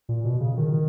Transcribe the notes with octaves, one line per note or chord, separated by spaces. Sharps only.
A#2
B2
C#3
D#3
D#3